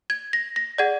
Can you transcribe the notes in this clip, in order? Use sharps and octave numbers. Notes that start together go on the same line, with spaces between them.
G#6
A#6
A#6
G#4 D5 F#5 G#6